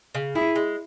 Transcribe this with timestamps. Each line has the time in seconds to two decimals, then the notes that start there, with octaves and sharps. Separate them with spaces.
0.15 C#3
0.35 E4 G#4
0.56 G#3